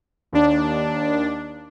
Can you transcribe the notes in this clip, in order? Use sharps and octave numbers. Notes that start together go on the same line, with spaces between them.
D#2 D4